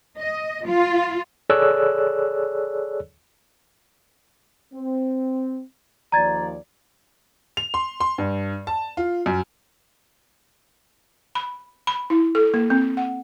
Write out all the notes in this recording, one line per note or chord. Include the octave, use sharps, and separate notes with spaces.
D#5
F4
G#4 A4 C#5 D5 E6 F#6
C4
D#2 F3 D5 A#5 G#6 A6
F7
C6
C6
G2
A5
F4
F#2
B5
B5
E4
A4
A#3
C4
F#5